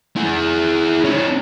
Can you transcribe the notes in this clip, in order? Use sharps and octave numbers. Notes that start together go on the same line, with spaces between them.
E4 G#4
C#4 D#4